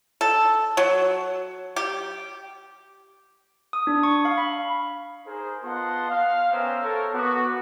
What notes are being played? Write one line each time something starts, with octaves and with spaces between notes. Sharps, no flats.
A4
F#3
G4
D#6
D4
C#6
F5
B5
D#4 G#4 A#4 C5
B3 F4 D#5 F#5 A5 C6
F5
B3 C#4 A#4 C5 E5 G5
A4 A#4 C#5
B3 F#4 D6